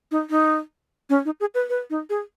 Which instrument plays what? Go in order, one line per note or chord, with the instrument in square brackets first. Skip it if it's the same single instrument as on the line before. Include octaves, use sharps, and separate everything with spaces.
[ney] D#4
D#4
C#4
D#4
G#4
B4
B4
D#4
G#4